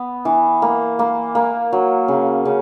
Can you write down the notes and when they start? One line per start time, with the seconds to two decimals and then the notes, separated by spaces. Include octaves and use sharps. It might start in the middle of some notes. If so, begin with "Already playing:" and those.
Already playing: B3
0.25 E3
0.62 A#3
0.99 A#3
1.35 A#3
1.72 F#3
2.08 C#3
2.45 C#3